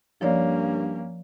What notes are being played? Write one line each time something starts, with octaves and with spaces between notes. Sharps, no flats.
G2 F3 A#3 C#4 C#5 D5